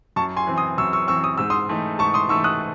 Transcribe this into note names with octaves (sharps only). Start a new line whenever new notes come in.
F#2 A5 C#6
G#5 C6
E3 C4
C6 D#6
F#2 C#6 E6
C#6 E6
E3 C4 C#6 E6
D#6
G#2 E6
C6 D#6
E3 A3 D#4
G#2 A5 C#6
C6 D#6
E3 A3 D#4 C#6 E6
D#6 F#6